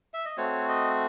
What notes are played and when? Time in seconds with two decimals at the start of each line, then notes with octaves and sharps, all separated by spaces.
0.14 E5
0.25 D#5
0.37 A3 C4 F#4 C#5
0.68 D#5